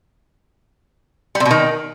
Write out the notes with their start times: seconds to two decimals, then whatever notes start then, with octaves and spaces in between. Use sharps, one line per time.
1.35 G3
1.40 C3
1.45 B2
1.51 D#3